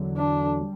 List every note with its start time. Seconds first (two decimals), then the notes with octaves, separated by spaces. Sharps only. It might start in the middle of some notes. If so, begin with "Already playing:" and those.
Already playing: E2 D3 F#3
0.17 D4
0.60 G3